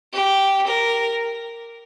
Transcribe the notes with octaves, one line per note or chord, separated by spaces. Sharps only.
G4
A#4